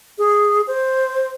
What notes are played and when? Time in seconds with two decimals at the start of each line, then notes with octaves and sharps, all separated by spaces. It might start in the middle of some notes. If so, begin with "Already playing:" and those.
0.18 G#4
0.67 C5